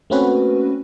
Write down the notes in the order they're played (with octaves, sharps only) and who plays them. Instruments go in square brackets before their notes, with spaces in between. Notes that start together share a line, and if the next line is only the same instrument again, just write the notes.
[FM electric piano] A3 A#3 C4 C#4 F#4 B4